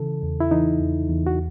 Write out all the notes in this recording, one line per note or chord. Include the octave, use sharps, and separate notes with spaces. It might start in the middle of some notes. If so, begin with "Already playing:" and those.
Already playing: C#3 E3 A4
E2
E4
E3 D#4
E2
E2
F#4